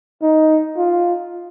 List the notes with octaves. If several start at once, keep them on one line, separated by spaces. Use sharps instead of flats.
D#4
F4